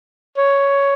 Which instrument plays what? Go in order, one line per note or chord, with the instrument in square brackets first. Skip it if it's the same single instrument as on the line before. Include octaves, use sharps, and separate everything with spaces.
[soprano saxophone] C#5